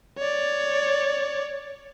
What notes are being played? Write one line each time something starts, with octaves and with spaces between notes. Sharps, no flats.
C#5 D5